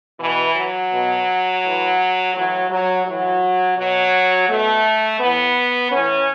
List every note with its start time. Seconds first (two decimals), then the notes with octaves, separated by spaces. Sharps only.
0.20 B2 E3
0.56 F#3
0.91 B2
1.63 A2 E3
2.34 A2 E3 F#3
2.70 F#3
3.06 A2 E3 F#3
3.77 B2 F#3
4.49 B2 A3
5.20 A2 E3 B3
5.91 A2 E3 C#4